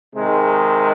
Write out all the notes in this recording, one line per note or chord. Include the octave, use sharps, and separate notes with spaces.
C3 D#3 G#3